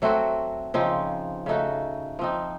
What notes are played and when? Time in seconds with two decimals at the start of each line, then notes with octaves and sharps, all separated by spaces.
0.02 F#3 A3 C4 F#4
0.74 C#3 F3 C4 D#4
1.46 C#3 A3 D#4 F#4
2.19 F3 C4 D#4